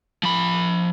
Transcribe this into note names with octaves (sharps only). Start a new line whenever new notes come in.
F3 B5